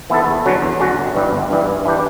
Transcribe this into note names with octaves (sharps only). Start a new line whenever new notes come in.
E3 B3 E4 A4
E2
D3 F#3 C#4 F#4
E2
D3 F#3 C#4 F#4
G1
G2 E3 G3
G1
G2 E3 G3
G2
E3 G3 D4 G4